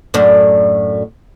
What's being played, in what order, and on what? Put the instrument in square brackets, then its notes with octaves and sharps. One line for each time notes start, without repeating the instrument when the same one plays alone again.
[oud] F#2 A2 D4